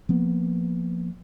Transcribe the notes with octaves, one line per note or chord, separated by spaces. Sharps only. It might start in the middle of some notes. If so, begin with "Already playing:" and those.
F3 A#3 B3